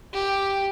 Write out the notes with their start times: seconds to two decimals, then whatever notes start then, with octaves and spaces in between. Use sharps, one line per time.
0.13 G4